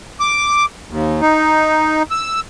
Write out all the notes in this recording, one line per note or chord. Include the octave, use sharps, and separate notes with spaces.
D6
D#2
D#4
E6